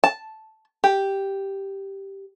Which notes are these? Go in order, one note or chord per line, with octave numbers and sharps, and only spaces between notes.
A5
G4